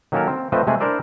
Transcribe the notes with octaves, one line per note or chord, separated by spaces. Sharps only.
D#3 F#3 A#3 C#4 A4 A#4
C4
F3 A3 C4 B4 C5 D#5
C3 G#3 A3 G#4
D4 E4 A#4 C5 D5 E5